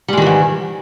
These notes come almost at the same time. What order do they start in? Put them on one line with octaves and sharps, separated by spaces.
G3 G#3 D#3 E3 G#2